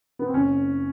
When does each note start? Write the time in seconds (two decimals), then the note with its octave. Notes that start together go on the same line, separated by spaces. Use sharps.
0.19 B3
0.26 C4
0.33 F#1 C#4